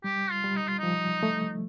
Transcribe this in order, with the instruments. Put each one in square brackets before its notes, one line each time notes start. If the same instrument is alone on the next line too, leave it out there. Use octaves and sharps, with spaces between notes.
[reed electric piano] G3 [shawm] G4
[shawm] F4
[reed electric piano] G3
[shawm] D#4
F4
[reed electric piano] F3 [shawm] D#4
[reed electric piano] A3